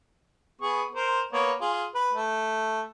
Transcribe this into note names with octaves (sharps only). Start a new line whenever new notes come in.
B3 G#4 C#6
A#4 C5
A#3 B3 C#5
F4 G#4
B4
A3